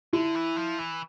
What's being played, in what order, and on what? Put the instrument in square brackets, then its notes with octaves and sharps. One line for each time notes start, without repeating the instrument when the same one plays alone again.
[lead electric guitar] D3 [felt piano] E4
[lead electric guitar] E3
F3
E3